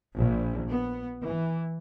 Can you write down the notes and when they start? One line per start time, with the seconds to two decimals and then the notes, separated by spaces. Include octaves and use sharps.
0.15 A#1
0.68 B3
1.22 E3